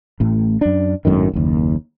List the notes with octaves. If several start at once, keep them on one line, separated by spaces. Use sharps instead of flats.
A1 A2
F#2 D4
G#1 F#2 A2 D#3
F#1 D#2